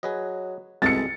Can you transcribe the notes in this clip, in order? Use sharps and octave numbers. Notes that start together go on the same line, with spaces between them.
F#3 G#4 B4 D#5
C2 B2 G#3 G#4 A4 A6 C#7